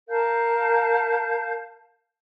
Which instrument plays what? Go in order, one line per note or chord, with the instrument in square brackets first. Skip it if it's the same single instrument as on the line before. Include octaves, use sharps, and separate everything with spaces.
[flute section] A#4 F5 A5 G6